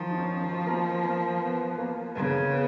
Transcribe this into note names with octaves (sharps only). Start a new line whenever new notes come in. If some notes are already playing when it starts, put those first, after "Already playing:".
Already playing: D#3 F3 D#4
D#4
C#4
C#4
D#3 D#4
A#3 A#4
A#3 A#4
B3 B4
B4
A#3 A#4
C#3 B3 B4
B3 B4